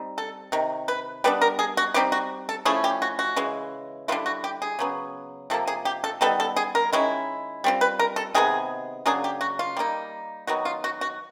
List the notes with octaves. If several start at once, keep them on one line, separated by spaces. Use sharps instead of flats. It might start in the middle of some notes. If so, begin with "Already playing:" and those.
Already playing: G3 C4 D#4
A4
C3 D#3
B4
G3 B3 D4 B4
A#4
G#4
F#4
G3 C4 D#4 G4
F#4
A4
F3 A3 C#4 E4 G#4
G4
F#4
F#4
C#3 E3 G#3
D3 G3 B3 E4 F4
F#4
G4
G#4
C#3 F#3 B3
C3 F3 A#3 A4
G#4
G4
A4
D#3 G3 B3 A4
A4
G#4
A#4
D#3 G#3 C#4 E4
G3 C4 F4
B4
A#4
A4
C3 D#3 G#3 B3 G#4
C#3 F#3 A#3 D4 G#4
G4
F#4
F4
G3 A#3 D#4
D#3 F#3 B3 F#4
F4
F#4
F#4